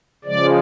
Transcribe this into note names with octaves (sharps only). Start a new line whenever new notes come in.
C#3 F3 G#3 D5